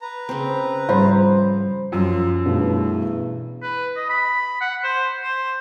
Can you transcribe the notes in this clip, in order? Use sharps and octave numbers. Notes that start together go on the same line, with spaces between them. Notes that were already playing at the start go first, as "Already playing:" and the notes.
B4 A#5
C#3 C4
G#2 F3 G3 C5 B5
F#2 F3
E2 G2 B2 A3
B4
D#5
B5
F#5
C5
C5